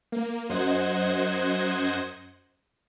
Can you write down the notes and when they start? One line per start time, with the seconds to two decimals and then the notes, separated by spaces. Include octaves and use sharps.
0.12 A#3
0.49 F#2 C5 D#5 F#5 G#6